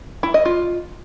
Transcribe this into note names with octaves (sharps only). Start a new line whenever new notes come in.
E4
D#5
F4